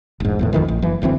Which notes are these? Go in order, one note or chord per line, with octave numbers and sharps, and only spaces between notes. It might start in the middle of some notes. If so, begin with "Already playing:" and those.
E1 G#2
D1 E2 A2
G#1 F2 D#3 E3
A1
F#1 E3
F#1 D2 E3 C4